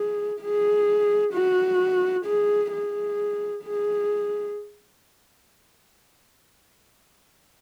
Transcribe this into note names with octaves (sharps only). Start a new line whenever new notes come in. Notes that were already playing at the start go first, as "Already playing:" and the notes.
Already playing: G#4
G#4
F#4
G#4
G#4
G#4